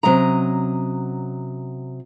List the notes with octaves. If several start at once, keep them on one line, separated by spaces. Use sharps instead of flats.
C3 F#3 C#4 D#5 A#5